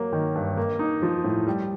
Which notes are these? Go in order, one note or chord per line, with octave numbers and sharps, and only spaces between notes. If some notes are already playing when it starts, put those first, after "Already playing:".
Already playing: F#3 A#3
D#3
G2
A#3
D#4
F3
A2
G3